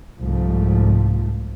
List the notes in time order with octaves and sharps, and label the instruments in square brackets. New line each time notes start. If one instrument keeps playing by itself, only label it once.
[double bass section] C2 G#2 F3 A3